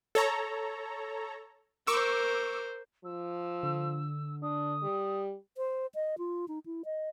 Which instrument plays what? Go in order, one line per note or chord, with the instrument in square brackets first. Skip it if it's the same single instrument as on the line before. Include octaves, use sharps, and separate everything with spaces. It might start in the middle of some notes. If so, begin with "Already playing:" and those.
[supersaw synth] A4 C#5 A#5
[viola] A#4 C5 [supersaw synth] C#6 D6 E6
[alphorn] F3 [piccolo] E6
[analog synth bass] D3
[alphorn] D4 [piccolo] D#6
[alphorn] G3
[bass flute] C5
D#5
F4
D#4
E4
D#5